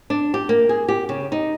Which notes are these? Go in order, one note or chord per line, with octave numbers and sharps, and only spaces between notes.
D4
G4
A#3
G#4
G4
C#3
D#4